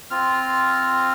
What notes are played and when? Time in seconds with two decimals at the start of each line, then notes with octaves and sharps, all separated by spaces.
0.11 C4 F4 F6